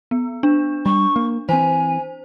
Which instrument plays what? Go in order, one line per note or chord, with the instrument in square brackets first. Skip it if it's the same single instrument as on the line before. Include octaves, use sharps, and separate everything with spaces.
[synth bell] B3
D4
[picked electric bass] G3 [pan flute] C#6
[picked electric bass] A#3
[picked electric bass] E3 C4 [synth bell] C5 [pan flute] G#5